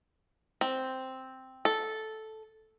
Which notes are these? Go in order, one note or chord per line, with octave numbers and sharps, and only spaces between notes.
C4
A4